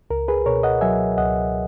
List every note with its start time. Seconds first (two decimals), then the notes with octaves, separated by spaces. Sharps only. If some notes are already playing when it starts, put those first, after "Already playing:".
0.10 C#2 A#4
0.28 G#4 B4
0.46 B2 A#4 C#5
0.63 D#5 F#5
0.81 F#3 E5 G#5
1.17 C#2 D#5 F#5